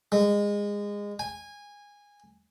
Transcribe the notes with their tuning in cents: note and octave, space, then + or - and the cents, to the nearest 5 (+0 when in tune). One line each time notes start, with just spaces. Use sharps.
G#3 -25
G#5 -20